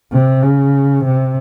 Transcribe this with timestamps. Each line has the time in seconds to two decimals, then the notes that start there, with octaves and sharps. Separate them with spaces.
0.12 C3
0.43 C#3
1.05 C3